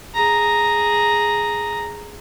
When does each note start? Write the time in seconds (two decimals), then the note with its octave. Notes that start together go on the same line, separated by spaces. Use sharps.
0.14 G#4 A#5